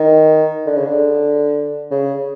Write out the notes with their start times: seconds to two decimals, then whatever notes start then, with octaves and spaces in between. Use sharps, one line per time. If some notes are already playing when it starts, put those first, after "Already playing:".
Already playing: D#3
0.66 D3
0.77 C#3
0.87 D3
1.91 C#3